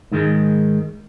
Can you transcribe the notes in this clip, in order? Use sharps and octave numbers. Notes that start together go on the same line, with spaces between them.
G#2 D#3 G#3